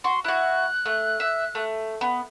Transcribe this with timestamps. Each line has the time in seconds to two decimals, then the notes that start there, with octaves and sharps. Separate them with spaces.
0.04 F#4 C6
0.24 E4 F#4 F#6
0.86 A3
1.20 E5
1.55 A3
2.01 B3